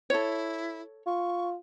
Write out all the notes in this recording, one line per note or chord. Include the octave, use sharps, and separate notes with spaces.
E4 A4 C#5
F4 C#6